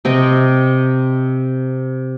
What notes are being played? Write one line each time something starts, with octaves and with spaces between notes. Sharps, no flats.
C3 C4 D#5 G5